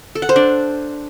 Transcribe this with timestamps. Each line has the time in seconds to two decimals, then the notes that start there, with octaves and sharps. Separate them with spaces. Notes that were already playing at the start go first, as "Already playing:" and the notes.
0.15 A4
0.22 F#5
0.29 C5
0.36 D4